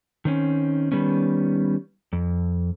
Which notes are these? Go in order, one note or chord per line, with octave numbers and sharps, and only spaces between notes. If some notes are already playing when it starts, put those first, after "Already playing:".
D#3 C4 C#4
D#3 G3 B3 C#4
F2